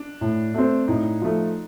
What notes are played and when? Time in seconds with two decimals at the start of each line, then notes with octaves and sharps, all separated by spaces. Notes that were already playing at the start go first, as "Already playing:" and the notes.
Already playing: D4
0.21 A2
0.54 A3 C4
0.88 A2 D#4
1.21 F3 A3